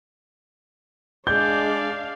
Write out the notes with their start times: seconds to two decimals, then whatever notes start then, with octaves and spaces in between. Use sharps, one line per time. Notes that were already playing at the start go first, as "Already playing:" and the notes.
1.27 G#3 D4 D5 F5 G6